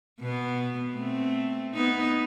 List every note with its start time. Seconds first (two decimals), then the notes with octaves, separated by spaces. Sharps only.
0.20 B2 B3
0.93 A3 C4
1.74 B3 D#4